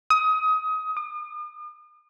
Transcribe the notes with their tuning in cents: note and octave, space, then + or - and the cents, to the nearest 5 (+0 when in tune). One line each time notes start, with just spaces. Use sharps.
D#6 +25
D#6 -45